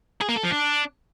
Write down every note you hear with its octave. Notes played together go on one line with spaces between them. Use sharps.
G#4
A#3
A4
F3
D4